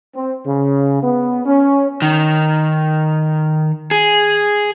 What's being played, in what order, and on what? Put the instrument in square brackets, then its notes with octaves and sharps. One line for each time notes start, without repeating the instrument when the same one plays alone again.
[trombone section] C4
C#3
B3
C#4
[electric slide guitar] D#3
G#4